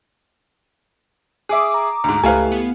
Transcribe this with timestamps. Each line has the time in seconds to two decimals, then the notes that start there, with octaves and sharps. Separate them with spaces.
1.49 G#4 E5 D6 D#6
1.74 A#5
2.04 D2 G#2 A#5
2.23 C#2 A3 E4 G4 A4 B4 F5 G#5
2.52 B3